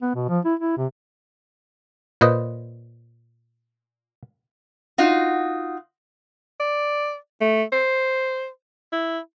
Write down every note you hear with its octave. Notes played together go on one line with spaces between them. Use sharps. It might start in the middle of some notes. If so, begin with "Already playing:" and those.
B3
B2
F3
E4
E4
C3
A#2 B4 C5 D#5
D#4 F4 F#4
D5
A3
C5
E4